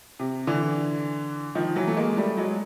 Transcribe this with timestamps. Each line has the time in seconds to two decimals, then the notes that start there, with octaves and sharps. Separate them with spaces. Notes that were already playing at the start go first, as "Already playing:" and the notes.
0.19 C3
0.47 D3 E3
1.55 D#3 F3
1.76 E3 F#3
1.87 A3
1.97 G#3 A#3
2.17 G3 A3
2.37 F#3 G#3